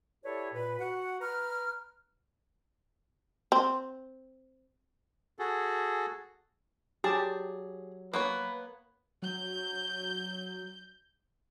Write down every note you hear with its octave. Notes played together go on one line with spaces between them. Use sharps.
E4 G4 A4 B4 C#5 D5
A#2 B4
F#4 F#5
B4 A#5 F6
C4
F#4 G#4 A4
F#3 G4 G#4 A5
A#3 B3 B4 C#5
F#3 G6